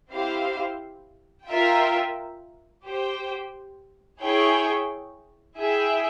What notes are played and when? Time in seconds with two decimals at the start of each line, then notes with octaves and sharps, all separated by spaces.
0.10 C4 E4 G4 C5 F5
1.47 F4 A#4 E5 G5
2.84 G4 C5 G5
4.21 E4 G#4 C#5 G5
5.58 E4 G#4 E5 G5